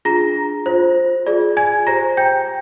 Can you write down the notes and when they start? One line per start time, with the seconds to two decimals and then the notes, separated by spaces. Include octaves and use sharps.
0.05 D4 F4 G#4 A#5 A#6
0.66 F4 C5
1.26 F4 G#4 D5
1.57 G#5 G#6
1.87 G4 C5 A#5 A#6
2.17 G5 G6